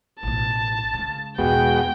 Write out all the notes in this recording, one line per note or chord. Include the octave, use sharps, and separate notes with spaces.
A1 B2 A5
C#3 G#3
E2 B2 G#3 B3 F#4 G5